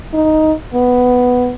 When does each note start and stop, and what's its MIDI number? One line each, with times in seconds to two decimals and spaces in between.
0.14 0.53 63
0.74 1.53 59